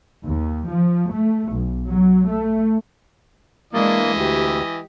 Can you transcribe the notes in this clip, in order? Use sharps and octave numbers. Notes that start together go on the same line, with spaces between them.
D#2
F3
A3
B1
F#3
A3
E3 G#3 A#3 D4 D#5
D2 G4